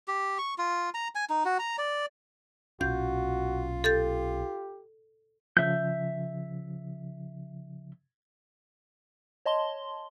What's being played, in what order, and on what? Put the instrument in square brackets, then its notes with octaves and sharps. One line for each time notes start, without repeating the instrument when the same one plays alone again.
[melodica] G4
C#6
F4
A#5
G#5
D#4
F#4
A#5
D5
[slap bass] B1 A#2 C#4 [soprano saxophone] F4 [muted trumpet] F#4 [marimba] G6
[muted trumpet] G4 [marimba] A4 G6 A6
[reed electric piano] C#3 F3 [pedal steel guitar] E5 G6
[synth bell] C#5 D#5 A5 C6 G7